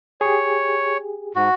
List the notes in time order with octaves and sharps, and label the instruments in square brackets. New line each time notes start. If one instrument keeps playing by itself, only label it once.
[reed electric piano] G4 G#4 [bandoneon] C#5
[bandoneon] G#2 [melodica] F#4